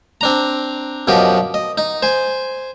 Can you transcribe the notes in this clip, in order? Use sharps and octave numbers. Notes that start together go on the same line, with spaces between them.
C4 D4 A#5
F#2 B2 F3 G4 D#5
D#5
D#4
C5 G#5